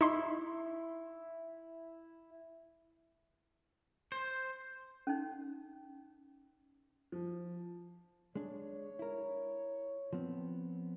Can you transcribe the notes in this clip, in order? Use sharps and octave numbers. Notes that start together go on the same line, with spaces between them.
D#4 E4 C6
C5
C#4 D#4
F3
G#3 D4 C#5
E4 A#4
F3 B3 C4